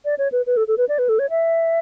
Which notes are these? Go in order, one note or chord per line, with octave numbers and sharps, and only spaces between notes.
D5
C#5
B4
B4
A4
A4
B4
D5
B4
A4
C#5
E5